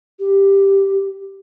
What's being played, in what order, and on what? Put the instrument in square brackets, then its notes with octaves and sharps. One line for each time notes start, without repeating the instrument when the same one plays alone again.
[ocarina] G4